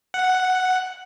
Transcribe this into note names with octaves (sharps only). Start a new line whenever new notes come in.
F#5